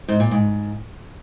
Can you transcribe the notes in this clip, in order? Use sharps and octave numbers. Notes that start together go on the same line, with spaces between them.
G#2
A#2
G#2